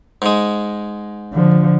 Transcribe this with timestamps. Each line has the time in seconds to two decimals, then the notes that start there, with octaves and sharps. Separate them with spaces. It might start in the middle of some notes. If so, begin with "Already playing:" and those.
0.22 G#2 G#3
1.33 D3 F3